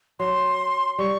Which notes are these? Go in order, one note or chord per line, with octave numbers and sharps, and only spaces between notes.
F#3 C6
G3 C#6